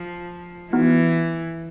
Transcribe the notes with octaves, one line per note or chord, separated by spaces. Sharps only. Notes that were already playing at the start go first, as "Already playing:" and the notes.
Already playing: F3
E3 B3 D#4 F#4